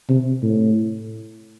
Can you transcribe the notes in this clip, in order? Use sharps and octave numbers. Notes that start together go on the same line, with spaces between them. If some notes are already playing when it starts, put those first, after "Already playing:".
C3
A2